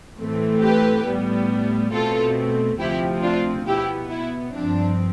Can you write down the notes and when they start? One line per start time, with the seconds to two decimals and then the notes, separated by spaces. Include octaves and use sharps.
0.18 A2 E3 A3 C4
0.61 G4 B4
1.05 A2 G3 B3
1.92 B2 A3 C4 F4 A4
2.79 D2 C3 F3 C4 E4 G4
3.23 D4 F4
3.66 B2 B3 E4 G4
4.10 E4
4.53 G2 F3 C4 D4